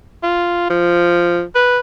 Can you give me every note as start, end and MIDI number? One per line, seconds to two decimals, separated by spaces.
0.24 0.66 65
0.70 1.42 53
1.55 1.79 71